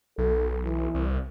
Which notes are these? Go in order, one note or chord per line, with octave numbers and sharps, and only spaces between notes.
B1 A4
E3
C2